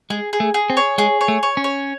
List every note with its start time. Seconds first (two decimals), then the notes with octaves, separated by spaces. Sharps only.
0.10 G#3 G#4
0.33 G#4
0.40 A3
0.54 G#4
0.70 C4
0.77 C#5
0.98 G#3 G#4
1.21 C#5
1.28 A3
1.43 C#5
1.57 C#4
1.64 C#5